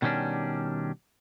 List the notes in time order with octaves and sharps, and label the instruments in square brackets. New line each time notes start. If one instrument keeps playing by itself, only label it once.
[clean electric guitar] B2 D#3 G3 C#4 D4